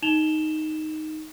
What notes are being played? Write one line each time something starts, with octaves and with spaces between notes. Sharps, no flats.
D#4 E7 F7 G7